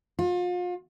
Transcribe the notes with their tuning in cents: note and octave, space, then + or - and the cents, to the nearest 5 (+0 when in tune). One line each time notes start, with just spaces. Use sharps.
F4 +35